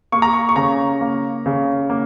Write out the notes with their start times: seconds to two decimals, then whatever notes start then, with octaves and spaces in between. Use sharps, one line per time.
0.12 A#3 C#6
0.22 A#5
0.33 C#6
0.49 C#6
0.56 C#3 A#5
1.01 A#3
1.46 C#3
1.90 A#3